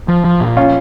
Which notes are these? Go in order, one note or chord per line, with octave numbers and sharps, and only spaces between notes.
F3
F3
A#2
C#4 F4